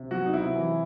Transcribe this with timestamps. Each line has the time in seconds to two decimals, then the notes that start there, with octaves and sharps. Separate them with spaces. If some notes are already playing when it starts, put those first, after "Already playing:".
Already playing: C3
0.11 F#3 F#4
0.26 D#4
0.33 C3 E4
0.56 E3